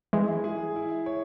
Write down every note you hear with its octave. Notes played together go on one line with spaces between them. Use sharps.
E3 G#3 E4
G#4
E4
C#5